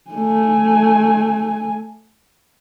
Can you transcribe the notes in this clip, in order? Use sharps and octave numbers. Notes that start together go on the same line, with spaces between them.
A3 G#5